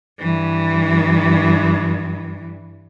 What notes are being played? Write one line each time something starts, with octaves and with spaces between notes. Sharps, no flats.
G2 E3